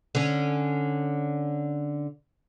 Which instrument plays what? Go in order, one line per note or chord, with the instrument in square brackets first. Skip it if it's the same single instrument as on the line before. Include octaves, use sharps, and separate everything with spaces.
[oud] D3 C#4